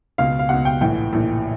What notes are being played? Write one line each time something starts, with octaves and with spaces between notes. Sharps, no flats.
C#2 B2 F5
F5
C#2 B2 F#5
G5
A#1 A2 E3 G5
A#1 A2 E3